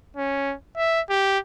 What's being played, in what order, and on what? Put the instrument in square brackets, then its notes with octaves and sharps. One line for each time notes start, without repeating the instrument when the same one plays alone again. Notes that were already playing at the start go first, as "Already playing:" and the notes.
[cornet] C#4
E5
G4